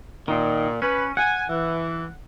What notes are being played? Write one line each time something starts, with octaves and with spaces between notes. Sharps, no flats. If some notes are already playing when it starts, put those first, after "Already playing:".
A#2 D#3
C#4 B4
F#5 G#5
E3